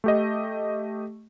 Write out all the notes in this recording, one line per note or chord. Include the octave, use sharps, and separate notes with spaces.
A3 G4 D#5